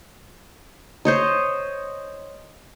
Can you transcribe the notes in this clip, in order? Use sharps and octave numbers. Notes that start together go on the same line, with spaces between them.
C5 C#5 D#5